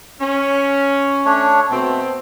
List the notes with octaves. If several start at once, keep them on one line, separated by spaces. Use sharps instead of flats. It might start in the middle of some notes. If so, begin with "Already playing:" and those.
C#4
A3 D4 C#5
B2 A3 C4